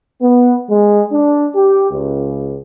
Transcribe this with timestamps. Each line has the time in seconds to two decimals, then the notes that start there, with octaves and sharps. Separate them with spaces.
0.21 B3
0.70 G#3
1.12 D4
1.55 G4
1.90 C#2